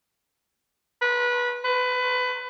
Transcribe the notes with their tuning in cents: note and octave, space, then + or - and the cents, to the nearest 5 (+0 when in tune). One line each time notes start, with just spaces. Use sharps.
B4 -20
B4 +25